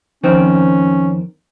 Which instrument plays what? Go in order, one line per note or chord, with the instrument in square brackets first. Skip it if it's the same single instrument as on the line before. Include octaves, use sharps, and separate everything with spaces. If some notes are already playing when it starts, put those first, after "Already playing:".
[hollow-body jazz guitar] F2 D#3 C4 [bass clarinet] C#4